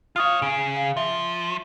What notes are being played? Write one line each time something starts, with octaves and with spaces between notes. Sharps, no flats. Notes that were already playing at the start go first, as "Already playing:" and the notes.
F4 C#5 F5 D#6 F6
C#3 G#4 D7
F5
F3 E5